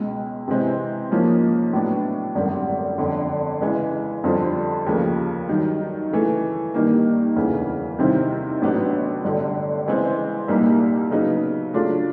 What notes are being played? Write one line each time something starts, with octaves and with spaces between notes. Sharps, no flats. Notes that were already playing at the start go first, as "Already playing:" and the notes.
Already playing: C#2 B2 G#3
C3 E3 G#3 C4 E4
G#2 F3 A#3 C#4
A2 F#3 B3 D4
G#1 F#2 D3 G3
G1 F2 D3
C#3 E3 G#3
F2 D3 G3 C4 F4
D#2 C#3 F3 A3
G2 D#3 F#3
C#3 E3 A3
G2 D#3 G3 A#3
E1 D2 C#3 E3
C3 D#3 G3 C4 E4
A1 A2 F#3 B3 D4
G1 G2 D3
C#3 E3 G#3 C4
C2 A#2 G3 A#3 D#4
C#3 F#3 B3 D#4
C#3 F#3 A3 D4 F4